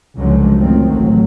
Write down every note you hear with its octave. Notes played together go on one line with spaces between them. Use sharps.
C#2 D3 F3 F#3 G#3
F#2 A2 D#3 F3 C4
A1 A2 F#3